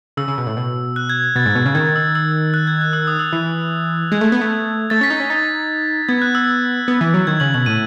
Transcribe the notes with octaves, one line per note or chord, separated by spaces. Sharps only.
C#3 E6
C#3
B2
A2
B2
F#6
G#6
B2 A6
G#2
B2
C#3
D#3 G#6
E6
E6
F#6
G#6
F#6
E6
D#6
E6
E3
G#3 G#6
A3
B3
A3
A3 A6
C#4 B6
D#4
B6
C#4
D#4 A6
B3 G#6
F#6
E6
B3
E3
F#3
D#3 G#6
C#3 F#7
B2 F#7
A2 D#7